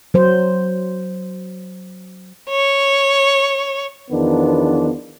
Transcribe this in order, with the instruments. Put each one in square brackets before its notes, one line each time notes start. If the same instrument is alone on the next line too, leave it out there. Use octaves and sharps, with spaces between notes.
[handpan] F#3 C5
[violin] C#5
[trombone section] E2 D#3 F3 B3 D4